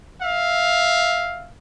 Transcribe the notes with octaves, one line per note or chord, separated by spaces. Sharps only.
E5 F5